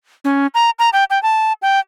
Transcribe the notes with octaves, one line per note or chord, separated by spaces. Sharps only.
C#4
A#5
A#5
G5
G5
A5
G5